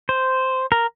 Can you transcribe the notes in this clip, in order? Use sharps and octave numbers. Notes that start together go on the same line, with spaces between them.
C5
A#4